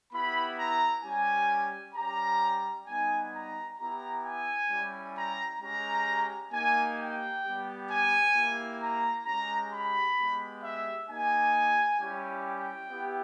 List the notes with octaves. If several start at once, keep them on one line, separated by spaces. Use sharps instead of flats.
B3 E4 G4 B5
A#5
G3 C#4 G4 G#5
G3 C#4 G4 A#5
G3 B3 D#4 G#5
A#5
B3 E4 G4 A#5
G#5
G3 C#4 E4 G4
A#5
G#3 C#4 G4 A#5
A#3 D#4 G4 G#5
G5
G3 B3 G4
G#5
A#3 E4 G4
A#5
G#3 C#4 G4 A#5
B5
G#3 B3 G4
E5
A#3 D#4 G4 G#5
G3 C#4 E4 G4
G5
B3 E4 G4